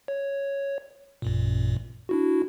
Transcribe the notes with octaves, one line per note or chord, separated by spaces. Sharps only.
C#5
A1 F#2 A#2
D4 E4 F#4